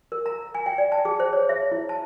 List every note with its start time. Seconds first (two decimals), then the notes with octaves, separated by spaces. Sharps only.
0.12 A#4
0.26 A#5
0.55 G#5
0.66 G5
0.78 D5
0.92 A5
1.05 G#4
1.20 C5
1.33 C#5
1.49 E5
1.72 E4
1.89 A5